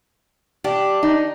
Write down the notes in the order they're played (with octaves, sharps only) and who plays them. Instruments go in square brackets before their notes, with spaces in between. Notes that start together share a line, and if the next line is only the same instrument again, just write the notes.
[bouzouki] D4 [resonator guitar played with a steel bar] G4
[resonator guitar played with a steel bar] D#4